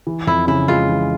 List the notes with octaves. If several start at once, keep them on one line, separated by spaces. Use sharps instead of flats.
E3
F2 E4
C#3 E4
G#3 F4
E3